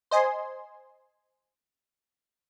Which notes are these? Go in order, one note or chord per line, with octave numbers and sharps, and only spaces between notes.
C5 D#5 G#5 C6